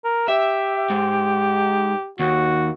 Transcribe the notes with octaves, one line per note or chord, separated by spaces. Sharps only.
A#4
G4 E5
G#2
D#2 F#4